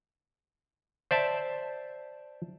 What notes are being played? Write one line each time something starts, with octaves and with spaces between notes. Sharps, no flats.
C5 D5 E5 A5